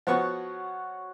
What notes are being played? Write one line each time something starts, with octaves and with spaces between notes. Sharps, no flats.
F3 B3 F#4 C#5 F#5 C#6